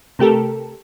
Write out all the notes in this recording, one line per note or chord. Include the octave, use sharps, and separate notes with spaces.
C3 A3 G4 A4 A#4